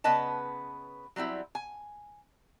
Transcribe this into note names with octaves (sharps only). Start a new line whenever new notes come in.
C#3 B3 B4 D#5 A5
F#3 G3 C4 E4
G#5